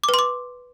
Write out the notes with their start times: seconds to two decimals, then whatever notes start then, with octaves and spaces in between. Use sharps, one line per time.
0.04 D6
0.09 B4
0.14 C6
0.19 D6